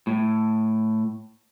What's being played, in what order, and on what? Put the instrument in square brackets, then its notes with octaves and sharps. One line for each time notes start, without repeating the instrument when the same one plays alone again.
[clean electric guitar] A2